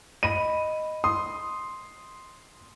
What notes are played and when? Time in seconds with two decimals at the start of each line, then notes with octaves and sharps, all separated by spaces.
0.23 D#5 B5 D#7
1.04 C6 D#6